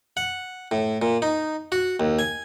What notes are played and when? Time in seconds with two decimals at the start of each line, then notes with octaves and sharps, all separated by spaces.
0.17 F#5
0.71 A2
1.02 A#2
1.22 D#4
1.72 F#4
2.00 D#2
2.19 G#5